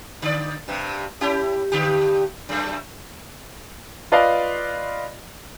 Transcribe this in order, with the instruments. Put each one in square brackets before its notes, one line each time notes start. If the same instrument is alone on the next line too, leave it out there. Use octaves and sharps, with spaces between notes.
[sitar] D3 D5
G2 C3
C#4 E4 G4
G2 D3 G4
F#2 A3
[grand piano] F4 B4 D5 D#5 F5